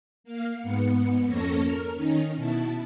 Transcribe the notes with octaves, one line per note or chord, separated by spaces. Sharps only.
A#3 F5
G#2 B3 C#7
F2 A#3 C#4 A4 C#6 A#6
A#4 F6
D#3 C#4 D#4
B2 E4 A5